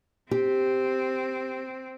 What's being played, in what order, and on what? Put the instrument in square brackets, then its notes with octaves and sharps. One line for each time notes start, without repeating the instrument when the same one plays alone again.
[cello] C4 [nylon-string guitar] G4